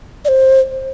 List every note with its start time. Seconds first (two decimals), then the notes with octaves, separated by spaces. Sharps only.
0.25 D5
0.28 C5